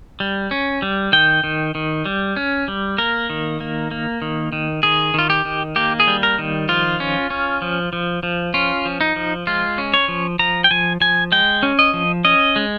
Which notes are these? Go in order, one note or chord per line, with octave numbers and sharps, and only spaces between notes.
G3
C#4
G3
D#3 G5
D#3
D#3
G3
C#4
G3
A#3 A#4
D#3
A#3
A#3
D#3
D#3
D#3 G#4
D#3 F4
G4
D#3
A#3 G4
G#4
G3
A#4
D#3
F3 F4
C#4
C#4
F3
F3
F3
C#4 F4
F3
D#4
F3
G#3 F4
C#4
C#5
F3
F3 A#5
G5
F3 G#5
F3 G#5
G#3 G5
C#4
D#5
F3
C#4 D#5
G#3